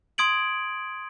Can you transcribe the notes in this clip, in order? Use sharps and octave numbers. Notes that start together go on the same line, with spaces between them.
C6 D#6 G#6 D7 F#7